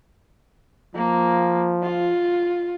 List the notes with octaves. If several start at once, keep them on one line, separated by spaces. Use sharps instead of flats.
F3 A#3
F4